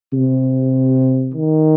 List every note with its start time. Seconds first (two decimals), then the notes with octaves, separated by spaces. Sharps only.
0.13 C3
1.34 D#3